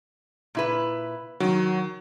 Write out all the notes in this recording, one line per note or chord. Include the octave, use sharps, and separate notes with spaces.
A#2 E4 B4
D#3 F#3